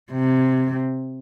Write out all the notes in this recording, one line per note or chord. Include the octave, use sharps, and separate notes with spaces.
C3